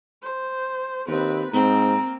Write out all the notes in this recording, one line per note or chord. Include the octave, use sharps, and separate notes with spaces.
C5
D#2 C4 B4
G#2 A#3 C4 A#5